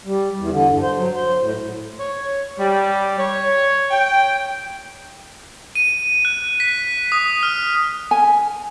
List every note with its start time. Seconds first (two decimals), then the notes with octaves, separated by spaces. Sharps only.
0.05 G3
0.38 E2
0.51 D3
0.71 G2
0.82 C5
0.97 F#3
1.14 C5
1.40 A2
1.99 C#5
2.59 G3
3.19 C#5
3.91 G5
5.75 D#7
6.25 F#6
6.60 B6
7.12 D#6
7.43 F6
8.11 G#5